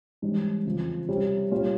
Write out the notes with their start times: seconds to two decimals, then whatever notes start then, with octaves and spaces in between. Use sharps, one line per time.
0.22 G#2 E3 G3 C#4
0.65 E2 C#3 F3 C4
1.09 C3 G3 C#4
1.51 A#2 G3 C#4 F4